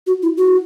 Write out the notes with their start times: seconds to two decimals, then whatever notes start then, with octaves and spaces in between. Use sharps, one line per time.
0.07 F#4
0.23 E4
0.38 F#4